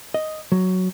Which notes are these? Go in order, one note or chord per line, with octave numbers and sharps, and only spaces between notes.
D#5
F#3